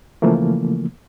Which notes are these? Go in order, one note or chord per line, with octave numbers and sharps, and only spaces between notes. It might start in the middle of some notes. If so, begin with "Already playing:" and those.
C#3 E3 F3 A3 A#3